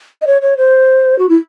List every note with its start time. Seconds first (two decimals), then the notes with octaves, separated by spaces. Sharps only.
0.21 D#5
0.27 C#5
0.42 C#5
0.57 C5
1.18 F#4
1.29 E4